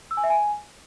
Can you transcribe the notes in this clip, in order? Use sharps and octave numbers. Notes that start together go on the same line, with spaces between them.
E6
G#5
E5
G#5